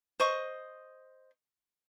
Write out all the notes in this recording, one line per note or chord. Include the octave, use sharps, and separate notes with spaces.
C5 D#5 C#6